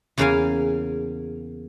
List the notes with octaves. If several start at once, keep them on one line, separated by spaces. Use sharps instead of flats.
E2 C#3 A#3 A#4 F5 G#5